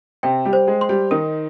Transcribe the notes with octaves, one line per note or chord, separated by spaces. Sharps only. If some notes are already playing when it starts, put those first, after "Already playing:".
C3 C4 G5
G3 G4
C5
G#3 G#4
C6
G3 G4
D#3 D#4 A#4